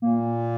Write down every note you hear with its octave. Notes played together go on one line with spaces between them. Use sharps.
A#2 A#3